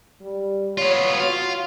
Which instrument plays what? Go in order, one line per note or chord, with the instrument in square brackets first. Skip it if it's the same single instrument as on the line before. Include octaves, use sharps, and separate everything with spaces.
[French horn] G3
[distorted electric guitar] B3 F4 [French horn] C#5
[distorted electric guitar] F4 [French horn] F#4